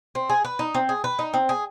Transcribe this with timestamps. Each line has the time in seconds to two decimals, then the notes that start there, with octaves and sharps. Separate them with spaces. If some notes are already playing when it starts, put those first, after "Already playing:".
0.15 C4
0.30 G#4
0.45 B4
0.59 D#4
0.74 C4
0.89 G#4
1.04 B4
1.19 D#4
1.34 C4
1.49 G#4